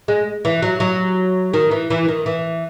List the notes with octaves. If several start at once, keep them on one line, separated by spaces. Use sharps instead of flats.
G#3
E3
F#3
F#3
D#3
E3
E3
D#3
E3